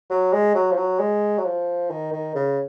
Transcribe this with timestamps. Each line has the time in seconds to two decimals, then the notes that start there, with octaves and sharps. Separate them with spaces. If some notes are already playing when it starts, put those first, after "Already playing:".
0.10 F#3
0.33 G#3
0.55 F#3
0.72 F3
0.77 F#3
0.99 G#3
1.38 F#3
1.45 F3
1.90 D#3
2.12 D#3
2.35 C#3